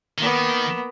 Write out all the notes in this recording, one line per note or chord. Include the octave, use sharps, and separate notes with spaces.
D#3 A#3 B3